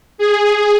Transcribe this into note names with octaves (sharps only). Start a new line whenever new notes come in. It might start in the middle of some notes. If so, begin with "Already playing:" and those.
G#4